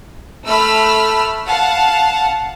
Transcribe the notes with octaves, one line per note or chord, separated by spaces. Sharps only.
A3 B5 E6 F6
F5 F#5 A5